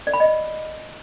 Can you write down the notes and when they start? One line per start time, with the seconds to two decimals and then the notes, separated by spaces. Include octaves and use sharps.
0.07 D5
0.13 B5
0.20 D#5